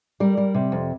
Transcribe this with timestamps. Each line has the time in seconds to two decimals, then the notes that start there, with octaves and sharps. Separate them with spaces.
0.20 G3 A#4
0.37 G3
0.54 C3
0.72 F2